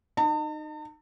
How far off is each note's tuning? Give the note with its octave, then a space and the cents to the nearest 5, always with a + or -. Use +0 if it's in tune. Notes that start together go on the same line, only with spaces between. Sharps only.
D#4 -20 A5 +45